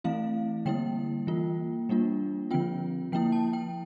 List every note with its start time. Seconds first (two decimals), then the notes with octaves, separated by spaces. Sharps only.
0.04 E3 A3 C4 E4 F5
0.65 D3 G3 A#3 E4 G5
1.27 E3 A#3 F4
1.89 G3 A#3 D4 F4
2.51 D3 F3 C4 F4 G5
3.12 F3 A#3 E4 G5
3.32 A5
3.53 G5